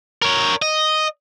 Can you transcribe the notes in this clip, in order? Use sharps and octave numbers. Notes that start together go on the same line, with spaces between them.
A#4 C#5
D#5